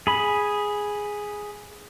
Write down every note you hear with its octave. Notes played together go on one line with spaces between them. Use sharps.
G#4 B5